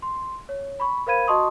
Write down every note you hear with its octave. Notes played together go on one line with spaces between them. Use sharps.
C6
C#5
B5 C#6
A#4 C5 F5 B5 G#6 D#7
F#4 D#5 A5 C6 C#6 D#6